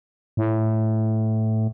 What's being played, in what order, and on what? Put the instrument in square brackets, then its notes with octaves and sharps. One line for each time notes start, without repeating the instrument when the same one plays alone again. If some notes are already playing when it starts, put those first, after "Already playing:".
[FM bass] A2